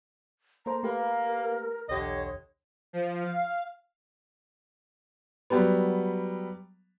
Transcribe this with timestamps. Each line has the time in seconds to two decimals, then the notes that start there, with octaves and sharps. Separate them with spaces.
0.66 A#3 A4 C5 A#5
0.83 A3 A#3 G4 A#4 B4
1.89 B1 E2 D3 G4 C#5 D#5
2.93 F3
3.25 F5
5.50 F#3 G3 B3